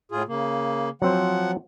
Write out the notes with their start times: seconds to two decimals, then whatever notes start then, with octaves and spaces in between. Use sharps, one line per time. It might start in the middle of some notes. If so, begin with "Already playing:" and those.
0.12 A2 F4 G#4
0.28 C#3 A#3
1.02 F3 F#3 C4 C5 F#5